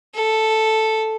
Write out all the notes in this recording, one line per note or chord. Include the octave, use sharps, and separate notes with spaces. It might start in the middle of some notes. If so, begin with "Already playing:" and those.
A4